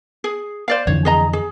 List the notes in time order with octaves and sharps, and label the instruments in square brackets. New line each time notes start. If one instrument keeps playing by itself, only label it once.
[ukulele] G#4
C5 D5 F5
[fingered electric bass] F2 D3 E3 [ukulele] C#5
[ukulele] G#4 D#5 A#5
G#4